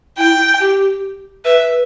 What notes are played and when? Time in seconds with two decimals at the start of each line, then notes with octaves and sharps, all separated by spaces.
0.17 E4 G5
0.60 G4
1.45 B4 E5